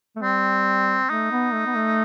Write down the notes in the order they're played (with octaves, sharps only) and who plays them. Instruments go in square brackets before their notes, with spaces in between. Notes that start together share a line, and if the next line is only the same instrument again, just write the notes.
[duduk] A3
[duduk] G3 [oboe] C4
[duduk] A3 [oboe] D#4
[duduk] B3
A3
B3
A3